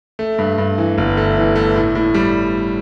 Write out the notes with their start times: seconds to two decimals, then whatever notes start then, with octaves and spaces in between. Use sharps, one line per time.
0.19 A3
0.38 G2
0.58 G2
0.78 E3
0.98 G1
1.17 A3
1.37 E3
1.56 A3
1.76 A2
1.95 A2
2.14 G3